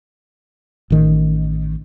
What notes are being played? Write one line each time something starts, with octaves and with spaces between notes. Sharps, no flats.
A1 D#3